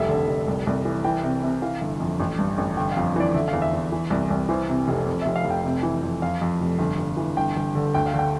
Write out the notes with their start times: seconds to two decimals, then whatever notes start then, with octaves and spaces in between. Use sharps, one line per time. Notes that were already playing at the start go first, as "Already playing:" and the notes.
Already playing: F1 C2 E5
0.09 D3
0.27 F1
0.48 C2
0.67 C2
0.85 E3
1.05 E3 G5
1.24 C3
1.43 C3
1.62 E3 F5
1.81 G1
2.00 F2
2.20 A1
2.39 G2
2.58 A1
2.77 G1 G5
2.91 F5
2.97 F2
3.16 E3 D5
3.35 D3 E5
3.48 F5
3.53 E2
3.62 E5
3.73 E2
3.92 E3
4.10 C2
4.30 C2
4.49 E3 C5
4.69 C3
4.88 F1
5.06 F2
5.21 F1 E5
5.36 F5
5.45 F1
5.50 G5
5.65 C3
5.83 E3
6.03 F2
6.22 F2 F5
6.41 F2
6.60 F1
6.79 G1
6.98 G1
7.17 E3
7.37 G1 G5
7.56 G1
7.75 D3
7.94 D2 G5
8.06 F5
8.14 D3
8.19 G5